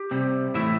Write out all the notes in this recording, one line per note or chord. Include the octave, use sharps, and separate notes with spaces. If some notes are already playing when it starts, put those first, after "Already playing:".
Already playing: G4
C3 G3 C4
A2 E3 A3 E4 E5